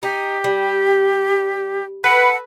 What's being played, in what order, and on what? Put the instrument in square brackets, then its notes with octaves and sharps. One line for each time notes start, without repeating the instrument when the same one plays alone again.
[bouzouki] D#4 [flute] G4
[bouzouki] G3
[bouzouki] A4 [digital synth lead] B4 [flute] F#5